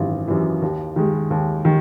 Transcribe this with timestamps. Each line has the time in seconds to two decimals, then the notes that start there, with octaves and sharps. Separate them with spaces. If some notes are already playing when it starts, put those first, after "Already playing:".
Already playing: G#1 F#2 E3
0.28 F#2 E3
0.62 D#2
0.96 D#3 G#3
1.31 D#2
1.65 D#3